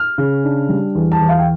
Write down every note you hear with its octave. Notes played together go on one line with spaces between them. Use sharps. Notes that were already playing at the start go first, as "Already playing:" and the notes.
Already playing: F6
C#3
D4
G3
E2
A5
E2
F5
G5